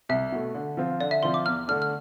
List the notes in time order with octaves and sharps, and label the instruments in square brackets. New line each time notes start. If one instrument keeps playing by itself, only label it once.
[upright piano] C2 [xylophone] E5
[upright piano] B2 A3
D3
F3 C4 F4
[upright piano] D3 [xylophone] D5
[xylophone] E5
[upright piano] F3 C4 F4 [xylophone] C6
[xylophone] D6
[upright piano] E2 [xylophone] F6
[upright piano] D3 A3 D4 [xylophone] F6
[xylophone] F6